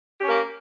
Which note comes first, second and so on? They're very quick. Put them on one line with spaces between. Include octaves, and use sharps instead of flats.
G4 C#4 A#4 A#3